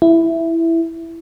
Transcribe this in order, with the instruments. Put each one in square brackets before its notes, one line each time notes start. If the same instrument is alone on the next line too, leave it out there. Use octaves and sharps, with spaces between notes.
[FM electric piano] E4